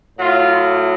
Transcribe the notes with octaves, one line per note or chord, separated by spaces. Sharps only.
A2 F#3 F4